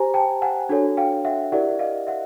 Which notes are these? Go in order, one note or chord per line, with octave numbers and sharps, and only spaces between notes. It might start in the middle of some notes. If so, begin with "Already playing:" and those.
Already playing: G4 C5 G#5 A#5
G5 A5
F#5 G#5
D4 F#4 A4 C#5
F5 G5
E5 F#5
E4 G4 A#4 D5 E5 F#5
D#5 F5
E5 F#5